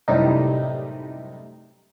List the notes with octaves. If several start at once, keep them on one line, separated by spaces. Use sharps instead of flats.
F#2 A2 C3 G3 D#4